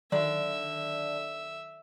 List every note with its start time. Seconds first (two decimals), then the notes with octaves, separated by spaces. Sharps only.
0.12 D3 D#3 F#3 D5 E5